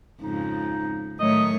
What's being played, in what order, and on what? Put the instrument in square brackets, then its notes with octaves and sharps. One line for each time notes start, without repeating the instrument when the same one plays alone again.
[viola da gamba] F2 G#2 C#3 [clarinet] D#4
[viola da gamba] A2 C#5 [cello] D#3 A3 [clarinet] F#3 [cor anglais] D#5